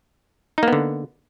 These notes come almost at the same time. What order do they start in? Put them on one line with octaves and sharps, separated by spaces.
D#4 A#3 B3 D3